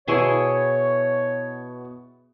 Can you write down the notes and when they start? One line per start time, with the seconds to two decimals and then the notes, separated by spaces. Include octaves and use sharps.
0.08 B2 B3 E4 G#4 C#5 C6 C#6